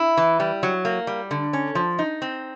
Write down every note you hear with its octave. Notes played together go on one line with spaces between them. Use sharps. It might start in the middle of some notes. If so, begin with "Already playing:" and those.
Already playing: E4
E3
G3
F#3
A#3
G3
D3
C#4
F3
D#4
C4